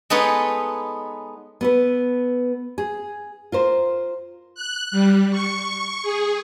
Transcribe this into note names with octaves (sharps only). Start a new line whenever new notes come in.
G#3 B3 D#4 A4 B4 C#5
B3 A4 B4
G#4
F4 A#4 C5
F#6
G3
C#6
G#4